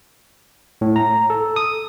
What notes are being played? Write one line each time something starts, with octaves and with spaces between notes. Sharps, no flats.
A2
A#5
A4
D#6